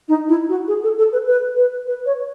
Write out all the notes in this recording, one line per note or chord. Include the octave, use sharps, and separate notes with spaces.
D#4
E4
F#4
G#4
A4
A4
B4
B4
B4
B4
C#5